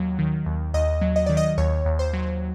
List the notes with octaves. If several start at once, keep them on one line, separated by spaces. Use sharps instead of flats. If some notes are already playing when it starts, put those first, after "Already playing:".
Already playing: D#2 F#3
D#3
D#2
D#2 D#5
F#3
D#5
D#3 D5
D#5
D#2 C#5
D#2
C5
F#3